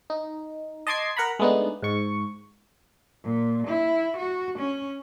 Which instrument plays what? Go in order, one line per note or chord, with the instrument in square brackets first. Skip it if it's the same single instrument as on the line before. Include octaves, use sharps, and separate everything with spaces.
[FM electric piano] D#4
D#5 A5 C6 D6 G#6 C7
A#4 F#5 A#5 B5
G#3 A3 B3 D4 D#4
G#2 C#6
[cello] A#2
E4
F#4
C#4